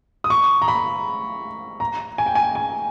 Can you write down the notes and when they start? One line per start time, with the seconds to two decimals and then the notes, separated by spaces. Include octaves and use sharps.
0.24 D#6
0.30 C#6
0.62 A#5
0.68 B5
1.80 A#5
2.18 G#5
2.26 G5
2.35 G#5
2.55 G#5